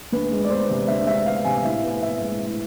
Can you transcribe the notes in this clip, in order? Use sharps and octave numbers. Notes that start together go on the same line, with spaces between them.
D2 B4
G#3
D5
B3 C5
C3
D2 E5
G#3 E5
B3 F5
C3 G#5
A2 E5
B3
A2 E5
G#3
A2